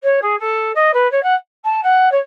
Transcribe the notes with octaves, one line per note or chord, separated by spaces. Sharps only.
C#5
G#4
A4
D#5
B4
C#5
F#5
A5
F#5
C#5